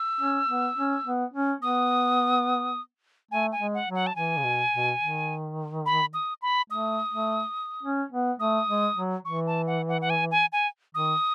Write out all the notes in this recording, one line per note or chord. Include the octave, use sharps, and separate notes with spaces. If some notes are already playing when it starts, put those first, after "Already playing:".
Already playing: E6
C#4
B3
C#4
B3
C#4
B3 D#6
A3 G#5
G#5
G#3
F#5
F#3
F#5
A5
E3 G#5
C#3
B2
B2
D#3
B5
D#6
B5
A3 D#6
A3
C#4
B3
A3 D#6
G#3
F#3
E3 C#6
A5
F#5
F#5
F#5
G#5
G#5
G#5
D#3 D#6